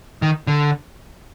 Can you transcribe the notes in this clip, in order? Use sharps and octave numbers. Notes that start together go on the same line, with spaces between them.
D#3
D3